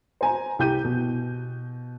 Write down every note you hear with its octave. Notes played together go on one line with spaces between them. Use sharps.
C5 G#5 A#5
C2 G4 G6 D#7
B2